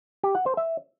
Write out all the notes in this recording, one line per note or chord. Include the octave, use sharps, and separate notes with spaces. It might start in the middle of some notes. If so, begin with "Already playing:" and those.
G4
F#5
C5
E5